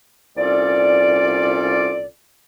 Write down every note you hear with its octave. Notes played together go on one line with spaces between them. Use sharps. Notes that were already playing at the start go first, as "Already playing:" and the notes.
C2 A#2 C#4 F4 A4 D5